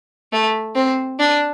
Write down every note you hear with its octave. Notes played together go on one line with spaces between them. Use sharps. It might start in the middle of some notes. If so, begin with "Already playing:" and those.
A3
C4
D4